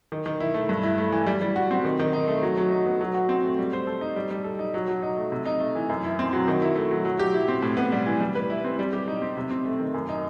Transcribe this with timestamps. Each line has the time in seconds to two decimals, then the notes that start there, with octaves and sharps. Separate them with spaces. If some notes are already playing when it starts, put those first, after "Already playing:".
0.12 D#3
0.26 D#3
0.40 E4
0.54 A3
0.69 G2
0.83 E4
0.98 A3
1.12 E3
1.27 G3
1.42 G3
1.56 F#4
1.71 C4
1.85 D#3
1.99 D#3
2.13 D#4
2.28 A3
2.42 F#3
2.57 F#3
2.71 D#4
2.86 B3
3.01 F#3
3.14 F#4
3.29 C4
3.44 A3
3.59 G3
3.73 C5
3.87 A4
4.01 D#4
4.16 G3
4.31 G3
4.44 A4
4.59 D#4
4.74 F#3
4.88 F#3
5.02 D#4
5.17 A3
5.32 C3
5.45 D#4
5.60 A3
5.75 E3
5.89 F#2
6.04 E4
6.19 C4
6.33 F#3
6.48 D#3
6.62 E4
6.76 A3
6.91 F#3
7.05 F#3
7.19 G4
7.34 E4
7.48 C4
7.62 A2
7.77 B3
7.92 G3
8.06 E3
8.20 G3
8.35 B4
8.50 E4
8.64 C4
8.79 G3
8.93 G4
9.08 D#4
9.22 C4
9.37 C3
9.51 C4
9.65 A3
9.80 D#3
9.94 F#2
10.09 D#4